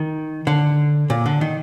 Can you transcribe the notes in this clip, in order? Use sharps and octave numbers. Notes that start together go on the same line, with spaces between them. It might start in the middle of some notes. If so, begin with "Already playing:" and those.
Already playing: D#3
D3
A#2
D3
D#3